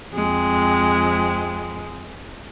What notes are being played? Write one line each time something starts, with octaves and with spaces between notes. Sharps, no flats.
F2 G#3 C4